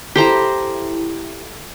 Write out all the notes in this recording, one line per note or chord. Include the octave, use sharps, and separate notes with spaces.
E4 G4 A4 C5 A#5